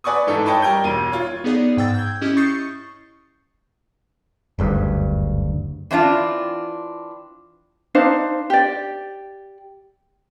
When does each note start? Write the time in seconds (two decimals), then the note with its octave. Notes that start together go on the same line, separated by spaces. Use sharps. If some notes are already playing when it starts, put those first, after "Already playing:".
0.04 B4 D5 G#5 C#6 D#6
0.27 G#2 E3 D#4 A4
0.46 C#5 D#5 G5 A5 B5 C#6
0.62 G3 A#4 G5 G6
0.84 E1 A#3 D#7
1.12 F4 C#5
1.44 B3 D#4 G#4 D5
1.77 G#2 G5 E6 A6
1.95 G6 G#6
2.22 C#4 E4 G4 D#5
2.37 C#6 D#6 G6 A6 C7 C#7
4.59 F#1 D2 G2
5.91 E3 C4 D4 F4
7.95 D4 D#4 C5 F5
8.50 G4 D5